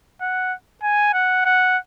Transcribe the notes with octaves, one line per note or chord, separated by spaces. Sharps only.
F#5
G#5
F#5
F#5